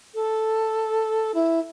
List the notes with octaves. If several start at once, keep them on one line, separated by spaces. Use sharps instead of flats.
A4
E4